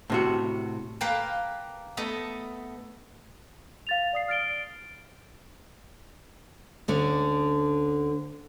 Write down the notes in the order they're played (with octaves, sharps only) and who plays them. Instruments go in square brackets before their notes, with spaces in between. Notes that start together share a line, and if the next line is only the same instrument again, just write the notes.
[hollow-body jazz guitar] A2 C3 F#4
[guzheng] A#3 B4 F5 G5 A5
A3 B3 A4 D#5
[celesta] F5 A6 F7
D5 D#6 C7
F6 A6 D7 G7
[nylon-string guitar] D2 D3 C#4